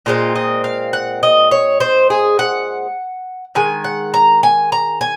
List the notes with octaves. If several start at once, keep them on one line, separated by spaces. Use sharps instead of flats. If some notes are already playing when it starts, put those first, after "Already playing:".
A#2 G#3 C4 F4
D#5
F5
F#5
D#5
C#5
C5
G#4
F#5
D#3 G#3 G#5
F#5
A#5
G#5
A#5
G#5